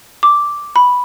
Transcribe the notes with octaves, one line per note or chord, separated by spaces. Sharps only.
D6
B5